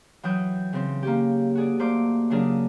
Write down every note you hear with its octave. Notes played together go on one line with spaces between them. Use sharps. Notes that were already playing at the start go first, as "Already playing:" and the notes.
E3 F#3 G5 D#6 F#6 G6
C#3 C4
A#3 C#4 G4
F#4 G#4 D5
A3 A#3 C5 D5 D6
C#3 F#3 D4 G#4 A#4